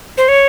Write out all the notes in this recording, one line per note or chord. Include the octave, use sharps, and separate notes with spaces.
C5
C#5